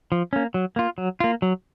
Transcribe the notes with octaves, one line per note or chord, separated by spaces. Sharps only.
F3
A#3 C#4
F#3
A#3 F4
F#3
A#3 F4
F#3